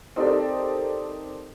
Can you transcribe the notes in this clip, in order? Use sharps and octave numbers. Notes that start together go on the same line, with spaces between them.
C4 D#4 G4 A4 A#4 D5